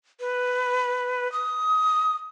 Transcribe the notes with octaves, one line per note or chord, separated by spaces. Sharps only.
B4
D#6